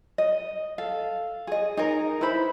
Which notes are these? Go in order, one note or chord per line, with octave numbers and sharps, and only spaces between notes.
D#5
A4 F5
G#4 D#5
D#4 G#4 A#4
E4 B4 C5 B5